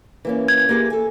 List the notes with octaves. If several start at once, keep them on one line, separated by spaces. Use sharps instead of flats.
E3 A#3 C#4
G#6
A#3 G4 G#4
A4 G#5